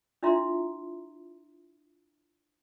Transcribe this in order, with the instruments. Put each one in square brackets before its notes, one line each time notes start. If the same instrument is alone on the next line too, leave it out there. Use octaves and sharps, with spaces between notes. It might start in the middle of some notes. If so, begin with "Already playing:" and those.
[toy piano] D4 E4 F4 E5 A#5 C6